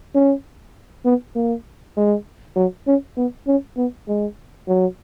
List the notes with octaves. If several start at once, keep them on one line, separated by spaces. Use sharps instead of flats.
C#4
B3
A#3
G#3
F#3
C#4
B3
C#4
B3
G#3
F#3